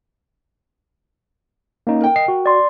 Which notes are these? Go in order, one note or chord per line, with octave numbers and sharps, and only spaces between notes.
A#3 C#4 D#4
A#4 G5
D#5 C7
F#4
D5 C6